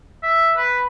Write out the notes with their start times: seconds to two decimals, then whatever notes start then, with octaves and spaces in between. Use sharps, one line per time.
0.23 E5
0.57 B4